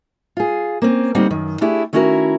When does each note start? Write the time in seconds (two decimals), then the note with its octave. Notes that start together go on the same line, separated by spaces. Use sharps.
0.37 F4 G#4
0.82 A#3 C4 C#4
1.15 D2 G3 A#3 C4 D#4 F#5
1.30 F#2 D#3
1.61 A3 D4 E4 G4 G#4
1.93 D#3 A3 C#4 E4 F#4 A#4